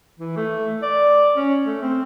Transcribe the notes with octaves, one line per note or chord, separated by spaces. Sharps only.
E3
A3
D5
C#4
A3
C4